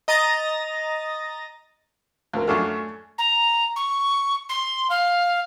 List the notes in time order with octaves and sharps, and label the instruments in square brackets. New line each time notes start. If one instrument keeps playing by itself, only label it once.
[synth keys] D#5 A#5 D#6 A6 A#6
[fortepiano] D2 [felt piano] F4 A#4
[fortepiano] F#2 D4 F4 [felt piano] A3 G#5 C#6
[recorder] A#5
C#6
C6
F5